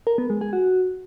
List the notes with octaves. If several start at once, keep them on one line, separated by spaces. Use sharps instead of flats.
A#4
B3
G#3
G#4
F#4